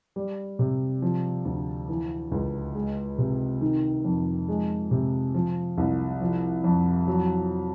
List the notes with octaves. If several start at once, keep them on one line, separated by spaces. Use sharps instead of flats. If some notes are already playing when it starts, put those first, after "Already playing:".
G3
C3
F3
D2
E3
C#2
G#3
C3
D#3
F2
G#3
C3
F3
C2
F3
F2
F#3